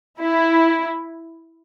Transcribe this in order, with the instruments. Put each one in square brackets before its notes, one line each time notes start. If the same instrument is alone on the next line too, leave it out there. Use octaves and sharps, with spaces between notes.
[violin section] E4